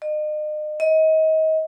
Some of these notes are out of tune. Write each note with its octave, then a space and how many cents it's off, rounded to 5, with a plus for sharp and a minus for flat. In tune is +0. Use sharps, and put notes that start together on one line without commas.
D#5 -40
D#5 +30